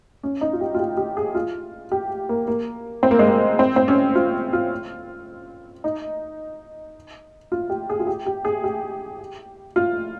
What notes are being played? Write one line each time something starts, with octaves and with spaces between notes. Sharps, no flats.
C#4
D#4
F4
G4
F4
G4
G4
G#4
F4
G4
A#3
A#3
C4
A#3
G#3
A#3
C4
C4
C#4
F4
F4
D#4
F4
G4
G#4
F4
G4
G4
G#4
G4
F4